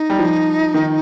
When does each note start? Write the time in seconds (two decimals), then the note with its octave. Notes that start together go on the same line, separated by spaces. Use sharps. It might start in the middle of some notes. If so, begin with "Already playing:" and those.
Already playing: D#4
0.10 G3
0.19 F3
0.74 D#3